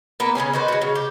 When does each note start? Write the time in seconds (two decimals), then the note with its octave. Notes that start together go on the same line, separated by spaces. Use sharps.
0.20 A#3 B3 B4
0.35 C#3 B3 C#4 G#4
0.53 D#3 F#4 B4 C5
0.68 G#3 F#4
0.81 C#3
0.95 G4